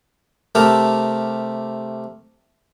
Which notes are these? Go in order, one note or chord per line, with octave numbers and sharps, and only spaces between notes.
C3 A3 G4 A4 A#4